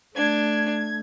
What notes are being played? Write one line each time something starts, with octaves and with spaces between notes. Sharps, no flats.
A3 D4 G#6